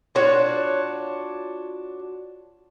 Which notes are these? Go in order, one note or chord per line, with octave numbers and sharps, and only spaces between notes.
D4 F4 F#4 C#5